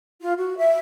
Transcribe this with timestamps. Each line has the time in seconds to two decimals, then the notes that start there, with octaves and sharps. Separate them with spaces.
0.21 F4
0.38 F#4
0.58 E5